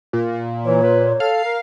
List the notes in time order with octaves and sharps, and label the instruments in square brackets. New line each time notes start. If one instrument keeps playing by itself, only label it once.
[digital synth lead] A#2
[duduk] E3 [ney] C#5
[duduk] B4
[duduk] A4 [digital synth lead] F5
[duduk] A#4